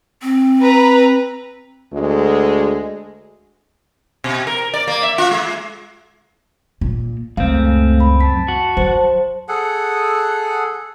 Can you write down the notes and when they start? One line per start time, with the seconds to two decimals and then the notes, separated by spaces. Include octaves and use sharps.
0.22 C4
0.60 B4 A#5
1.93 D2 G#3
4.24 B2
4.47 A#4
4.74 D5
4.87 A#3
5.03 E5
5.18 F4
5.31 G#3
6.81 A#2
7.37 C#2 F#2 A3 C4 F5
8.00 B5
8.21 A5 B6
8.48 F#4
8.77 F#3 C5
9.48 G#4 A4 F#5